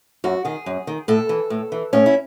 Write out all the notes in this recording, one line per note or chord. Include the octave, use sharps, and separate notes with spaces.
F#2 F#4
D#3 G#4
F#2
D#3
A2 A4
E3
A2
E3
A2 C#4
E4